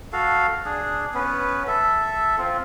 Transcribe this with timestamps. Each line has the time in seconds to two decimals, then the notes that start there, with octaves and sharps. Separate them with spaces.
0.13 F#4 A4 F5
0.65 D4 G#4
1.14 B3 C#4 B4
1.67 A4 E5
2.38 C4 F4